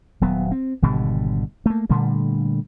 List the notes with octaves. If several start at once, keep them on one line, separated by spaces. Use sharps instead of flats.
D#1 F#3 B3
C4
G#1 B2 D3 G3
A3 A#3
A#2 D3 G3 A3